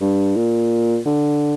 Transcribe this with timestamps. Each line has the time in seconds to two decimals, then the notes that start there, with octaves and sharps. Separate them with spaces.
0.01 G2
0.36 A#2
1.06 D3